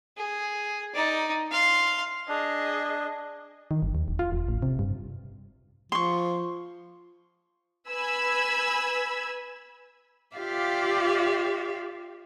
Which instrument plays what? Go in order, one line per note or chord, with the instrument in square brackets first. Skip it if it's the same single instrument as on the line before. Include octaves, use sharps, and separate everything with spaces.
[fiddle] G#4
D#4 D5
F5 C6
[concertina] D4 [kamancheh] G#4 D#5
[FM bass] D#3
G1
D#2
E1
F4
E1
A1
C3
G2
[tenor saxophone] F3 [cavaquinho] C6 C#6
[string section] B4 G#5 B5 E6 G#6
[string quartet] F4 G4 D5 E5 F5